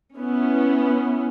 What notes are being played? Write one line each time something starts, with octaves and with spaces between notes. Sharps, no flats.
B3 C#4 E4